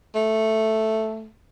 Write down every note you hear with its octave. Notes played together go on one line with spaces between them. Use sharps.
A3